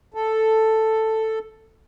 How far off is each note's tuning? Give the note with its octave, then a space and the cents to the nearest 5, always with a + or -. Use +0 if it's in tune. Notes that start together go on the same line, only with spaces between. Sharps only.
A4 +5